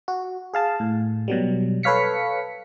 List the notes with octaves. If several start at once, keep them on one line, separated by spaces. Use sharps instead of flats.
F#4
G#4 F5 A5
A2
B2 F#3 G3
A4 B4 C#5 F5 B6 C#7